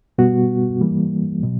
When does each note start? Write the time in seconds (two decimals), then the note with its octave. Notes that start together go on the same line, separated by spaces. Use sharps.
0.18 B2 G3 B3 F#4
0.81 E3 G3 A#3
1.43 B2 F#3